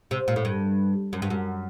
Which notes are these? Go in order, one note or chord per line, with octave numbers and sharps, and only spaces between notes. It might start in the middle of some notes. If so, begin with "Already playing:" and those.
C3
A#2
A2
G2
F#2
G2
F#2